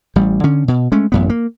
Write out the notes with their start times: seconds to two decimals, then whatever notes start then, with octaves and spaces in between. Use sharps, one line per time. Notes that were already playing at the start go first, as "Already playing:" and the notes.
0.16 A1 G3
0.44 D3 C#4
0.68 B2
0.92 G#3 A3 C#4
1.12 A1 F#2 B3
1.30 A#3